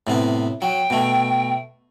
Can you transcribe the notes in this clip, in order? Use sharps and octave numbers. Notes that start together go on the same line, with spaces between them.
A2 C3 B3
F#3 G5
B2 A3